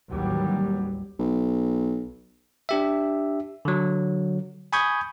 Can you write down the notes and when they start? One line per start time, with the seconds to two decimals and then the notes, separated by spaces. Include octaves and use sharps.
0.11 A1 D#2 F#3 G3
1.19 B1
2.69 D4 G4 E5
3.65 D3 F#3
4.73 G#5 B5 C#6 D#6 G6 G#6